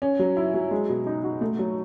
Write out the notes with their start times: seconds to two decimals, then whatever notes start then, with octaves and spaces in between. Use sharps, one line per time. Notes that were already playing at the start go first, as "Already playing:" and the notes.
0.02 C#4
0.19 F#3
0.37 E4
0.54 F#3
0.71 G#3
0.89 B2
1.07 D#4
1.24 F#4
1.41 A3
1.59 F#3